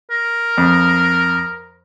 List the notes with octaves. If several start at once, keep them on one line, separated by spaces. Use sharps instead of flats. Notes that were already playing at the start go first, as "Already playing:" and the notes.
A#4
F2